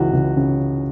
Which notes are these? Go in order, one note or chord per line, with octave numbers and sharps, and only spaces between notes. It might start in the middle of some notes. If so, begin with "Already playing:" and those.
Already playing: C#2 C#3 E3 F#4
C#2
C#3